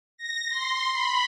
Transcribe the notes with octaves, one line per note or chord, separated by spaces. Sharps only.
A#6
C6
B5